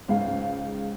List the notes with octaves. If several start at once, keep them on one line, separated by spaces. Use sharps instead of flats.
C#2 G#2 F5